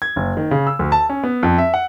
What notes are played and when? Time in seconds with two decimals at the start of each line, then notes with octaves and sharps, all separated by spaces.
0.02 G#6
0.16 F#1
0.37 D#3
0.51 C#3
0.67 E6
0.79 D2
0.92 A5
1.09 C#4
1.24 B3
1.43 F2
1.58 E5
1.74 F#5